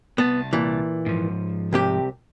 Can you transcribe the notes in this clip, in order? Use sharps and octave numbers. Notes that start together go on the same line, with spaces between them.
C2 B3 A5
A#2 E3
G#2 F3
C2 C3 G4